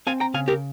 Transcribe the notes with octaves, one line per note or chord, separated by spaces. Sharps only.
C4 F5 G#5
G5 A#5
C#3 F5 G#5
G4 A#4